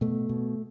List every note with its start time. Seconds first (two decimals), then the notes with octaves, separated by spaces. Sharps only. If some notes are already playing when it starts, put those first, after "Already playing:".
0.01 B2 A3
0.29 B2